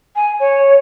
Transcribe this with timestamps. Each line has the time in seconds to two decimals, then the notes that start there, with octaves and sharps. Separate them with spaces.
0.15 G#5
0.40 C#5